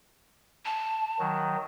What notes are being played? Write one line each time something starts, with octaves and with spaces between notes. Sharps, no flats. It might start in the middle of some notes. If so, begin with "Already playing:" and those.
A5
D#3 F#3